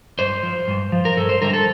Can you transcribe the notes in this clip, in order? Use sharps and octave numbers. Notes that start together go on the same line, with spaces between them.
G2 C5
F3
G2
F3
A#4
G2 A4
C5
D3 G3 A#4
A4